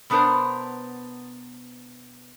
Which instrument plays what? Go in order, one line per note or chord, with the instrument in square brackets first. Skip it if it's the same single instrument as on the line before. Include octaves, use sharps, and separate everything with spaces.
[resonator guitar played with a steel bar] B2 B3 D4 A#4 C5